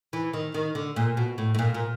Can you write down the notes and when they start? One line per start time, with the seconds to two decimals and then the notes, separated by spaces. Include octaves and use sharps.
0.13 E3
0.33 D#3
0.54 D#3
0.75 D3
0.96 A#2
1.17 B2
1.38 A2
1.55 A2
1.59 A#2
1.74 A#2